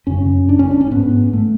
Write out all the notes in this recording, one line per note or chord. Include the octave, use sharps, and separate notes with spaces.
F#2 C#3 C#4
D4
C#4
D4
C#4
G#2 B3
A3